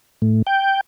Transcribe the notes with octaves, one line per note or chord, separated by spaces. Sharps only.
A2
G5